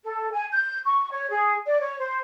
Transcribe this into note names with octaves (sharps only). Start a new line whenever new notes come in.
A4
G#5
G6
C#6
C#5
G#4
D5
C#5
C5